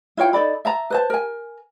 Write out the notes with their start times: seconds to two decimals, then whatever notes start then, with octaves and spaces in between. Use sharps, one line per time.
0.17 E4 F4 C#5 G5
0.33 D#4 A4 D5 B5
0.65 E5 A5 A#5
0.90 B4 C5 A5
1.10 A#4 G#5